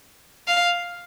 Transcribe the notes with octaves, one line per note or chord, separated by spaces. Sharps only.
F5